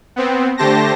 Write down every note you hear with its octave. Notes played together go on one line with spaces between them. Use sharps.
B3 C4
D3 A3 G4 C5 A5 A#6